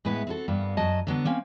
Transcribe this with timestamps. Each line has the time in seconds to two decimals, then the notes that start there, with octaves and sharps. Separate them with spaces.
0.05 A2 G#3 B3 B4
0.27 C4 F#4 A4
0.48 G2 G3 A#3 B3
0.77 F#2 F#3 D#5 A5
1.07 D3 F#3 B3 D4
1.25 A#3 C4 C#4